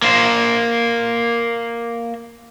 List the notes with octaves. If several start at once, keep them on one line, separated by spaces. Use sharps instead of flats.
A#3 C5